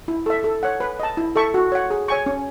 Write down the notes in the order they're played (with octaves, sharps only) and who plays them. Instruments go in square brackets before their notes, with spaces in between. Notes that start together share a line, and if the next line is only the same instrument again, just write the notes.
[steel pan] E4
A4 E5
A4
C#5 F#5
B4
D#5 A5
E4
A4 E5 A5 C#6
F#4
C#5 F#5
G#4
C#5 G#5 C#6
C#4